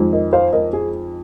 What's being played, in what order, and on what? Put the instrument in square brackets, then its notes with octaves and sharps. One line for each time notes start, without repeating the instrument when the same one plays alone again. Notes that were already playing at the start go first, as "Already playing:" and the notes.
Already playing: [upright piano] F2 D#3 G#3
A#4 D#5
C5 F5
A#4 D#5
G#4